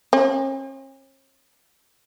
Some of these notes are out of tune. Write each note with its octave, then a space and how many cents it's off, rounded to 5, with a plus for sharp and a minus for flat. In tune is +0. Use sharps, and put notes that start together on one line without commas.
C#4 -45